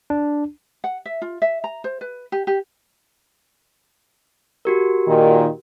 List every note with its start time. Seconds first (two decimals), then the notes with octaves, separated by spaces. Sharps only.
0.10 D4
0.84 F#5
1.05 E5
1.22 F4
1.42 E5
1.64 A#5
1.84 C5
2.01 B4
2.32 G4
2.47 G4
4.65 F#4 G4 A#4
5.08 A#2 D#3